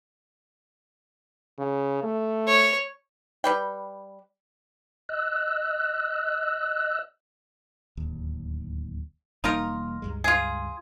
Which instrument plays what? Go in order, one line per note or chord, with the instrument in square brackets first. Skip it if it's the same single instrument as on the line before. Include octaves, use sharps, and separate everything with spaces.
[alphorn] C#3
A3
[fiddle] C#5
[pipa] G3 B4 G5
[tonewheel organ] D#5 E6 F#6
[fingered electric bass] D1 D#2
[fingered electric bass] E1 G3 A#3 [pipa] D#4 F4 A#4
[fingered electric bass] C#2 G2 G#3
[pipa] F4 G#4